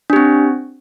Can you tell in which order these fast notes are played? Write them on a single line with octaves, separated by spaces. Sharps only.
D4 G4 C4